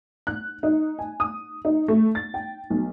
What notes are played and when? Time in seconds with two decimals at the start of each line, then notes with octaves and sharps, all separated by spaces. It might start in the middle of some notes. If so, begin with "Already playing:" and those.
0.27 F#6
0.63 D#4
0.99 G#5
1.20 D#6
1.65 D#4
1.88 A3
2.15 A6
2.34 G5
2.70 B1